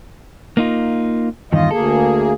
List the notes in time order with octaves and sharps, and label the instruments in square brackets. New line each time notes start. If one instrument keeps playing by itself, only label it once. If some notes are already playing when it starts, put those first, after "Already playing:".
[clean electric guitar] A#3 D#4 F4
[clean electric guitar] E2 G2 D#3 [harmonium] F4 D#5
[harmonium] D2 A#3 G#4 [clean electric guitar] A4